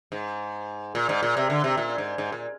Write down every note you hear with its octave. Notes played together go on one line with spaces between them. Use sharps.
G#2
A#2
G#2
A#2
C3
D3
C3
A#2
G#2
G#2
A#2